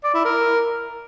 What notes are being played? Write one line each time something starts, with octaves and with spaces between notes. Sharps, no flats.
D5
E4
A#4